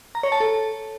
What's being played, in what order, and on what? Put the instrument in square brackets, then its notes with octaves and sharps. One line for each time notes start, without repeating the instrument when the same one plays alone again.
[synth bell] A#5
C#5
A5
A4